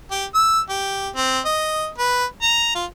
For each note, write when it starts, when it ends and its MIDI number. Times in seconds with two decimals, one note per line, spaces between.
0.11 0.25 67
0.35 0.60 88
0.69 1.09 67
1.15 1.39 60
1.45 1.88 75
1.98 2.25 71
2.42 2.71 82
2.75 2.85 65